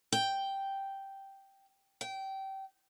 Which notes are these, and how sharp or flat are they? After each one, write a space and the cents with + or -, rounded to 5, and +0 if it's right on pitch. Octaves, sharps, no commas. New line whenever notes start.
G5 -5
G5 -20